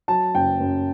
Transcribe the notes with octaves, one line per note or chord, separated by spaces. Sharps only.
F#3 A5
F#1 G5
F#2